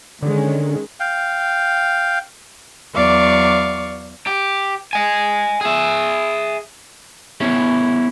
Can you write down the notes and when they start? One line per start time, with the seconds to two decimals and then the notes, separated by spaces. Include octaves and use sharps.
0.22 D3 D#3 G#3 C#4
1.00 F5 G5
2.94 E2 F#3 D5 F5 C#6 D6
4.27 G4
4.93 D#5 G#5
5.61 G#4 E5
7.40 B3 C#4 E4 G#4